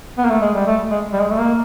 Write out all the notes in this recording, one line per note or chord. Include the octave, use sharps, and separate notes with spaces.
B3
A#3
A3
G#3
G3
A3
G#3
G3
G#3
A3
A#3